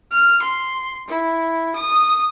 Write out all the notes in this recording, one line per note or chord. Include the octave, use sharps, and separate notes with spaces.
F6
C6
E4
D#6